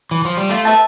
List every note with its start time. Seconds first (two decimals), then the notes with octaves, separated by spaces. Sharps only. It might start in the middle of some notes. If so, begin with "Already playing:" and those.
0.11 E3
0.25 F3
0.37 G3
0.49 A3 F4
0.65 B4 E5 A5